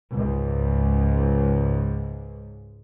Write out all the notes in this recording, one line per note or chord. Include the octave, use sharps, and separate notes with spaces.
C#2 G#2